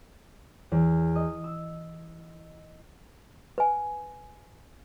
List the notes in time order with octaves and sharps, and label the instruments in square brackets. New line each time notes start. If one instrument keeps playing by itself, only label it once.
[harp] E2
D#5
E6
[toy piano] B4 G#5